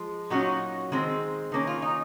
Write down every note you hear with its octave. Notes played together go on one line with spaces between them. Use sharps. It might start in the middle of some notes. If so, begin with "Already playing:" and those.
Already playing: F3 G#3
A#2 F#3 C#4 D#4 F#4
D#3 G#3 C4
D#3 A#3 C#4
F4
D#4